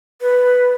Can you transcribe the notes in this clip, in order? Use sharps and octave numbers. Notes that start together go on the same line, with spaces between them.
B4